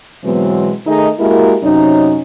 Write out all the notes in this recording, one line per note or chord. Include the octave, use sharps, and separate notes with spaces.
B2 E3 F#3 G#3 B3 C4
D#3 A3 D#4 G#4 D#5
G#3 A#3 E4 F#4 G4 A#4
F#2 C3 F#3 C#4 D#4